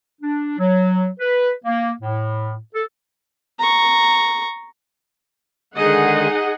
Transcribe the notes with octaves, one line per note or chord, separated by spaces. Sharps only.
D4
F#3
B4
A#3
A2
A4
A#5 C#6
D3 D#3 G#3 D#4 G#4 D#5 F#5